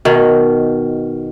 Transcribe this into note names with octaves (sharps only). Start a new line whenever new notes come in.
B2 D#3